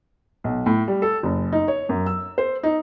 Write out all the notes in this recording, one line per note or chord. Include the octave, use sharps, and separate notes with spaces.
B1
A2
G3
A4
F#1
D#4
C#5
F#2
E6
C5
D#4